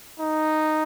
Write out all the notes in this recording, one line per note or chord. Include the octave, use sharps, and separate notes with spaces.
D#4